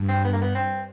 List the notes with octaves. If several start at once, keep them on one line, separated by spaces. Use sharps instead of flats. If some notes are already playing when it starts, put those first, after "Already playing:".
Already playing: G2
C4
B3
A#3
B3
C4